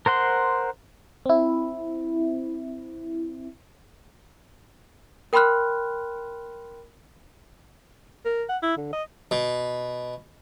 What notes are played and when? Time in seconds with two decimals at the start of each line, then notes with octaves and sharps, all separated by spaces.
0.06 A#4 C5 F#5 C6
1.26 C4 E4
5.33 A#4 G5 B5 C6 F6 F#6
8.25 A#4
8.49 F#5
8.63 E4
8.77 D3
8.93 D#5
9.31 B2